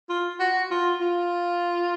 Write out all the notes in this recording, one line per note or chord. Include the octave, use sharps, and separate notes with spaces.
F4
F#4
F4
F4